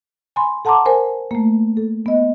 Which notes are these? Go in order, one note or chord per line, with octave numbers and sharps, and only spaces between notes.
G#5 B5 C6
A4 F#5 A5 A#5 C6 D6
A#4 C5 G#5
A3 A#3
A4
B3 D#5